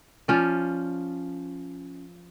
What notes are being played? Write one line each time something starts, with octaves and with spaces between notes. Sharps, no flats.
F3 C#4 D5